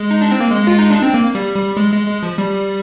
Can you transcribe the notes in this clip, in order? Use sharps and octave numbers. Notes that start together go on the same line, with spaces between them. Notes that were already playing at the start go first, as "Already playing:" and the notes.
Already playing: G#3
D#4
D4
C4
A#3
G#3
F4
D#4
D4
C4
A#3
G3
G3
G#3
G#3
G#3
F3
G3